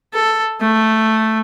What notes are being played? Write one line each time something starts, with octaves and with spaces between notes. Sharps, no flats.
A4
A3